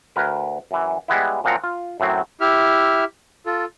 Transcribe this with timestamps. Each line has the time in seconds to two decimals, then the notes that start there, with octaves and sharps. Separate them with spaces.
0.16 D2 A#4 B4
0.71 F#2 E3
1.08 G3 G#3 B3 E4
1.44 F#2 A#2 F3 C4 F#5 A#5
1.64 F4
2.00 F#2 A2 F#3 C4
2.41 E4 G4 E5 F6
3.46 F4 A4